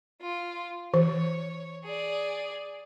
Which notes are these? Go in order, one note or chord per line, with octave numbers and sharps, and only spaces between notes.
F4
E3 C#5
G#4 D5